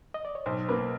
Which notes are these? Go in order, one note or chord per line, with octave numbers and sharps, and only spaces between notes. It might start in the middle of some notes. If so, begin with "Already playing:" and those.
D#5
D5
C#5
B1 C5
A#3 B4